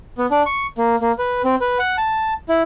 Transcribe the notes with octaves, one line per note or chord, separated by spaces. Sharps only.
B3
D4
C#6
A#3
A#3
B4
C4
B4
F#5
A5
E4